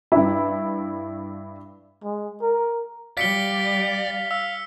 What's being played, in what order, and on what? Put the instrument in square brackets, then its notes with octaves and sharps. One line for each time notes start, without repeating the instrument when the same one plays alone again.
[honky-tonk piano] G2 E4
[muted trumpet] G#3
A#4
[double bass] G3 [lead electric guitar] D5 [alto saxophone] F5 [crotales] B6 C#7 G7
[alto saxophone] F5 [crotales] E6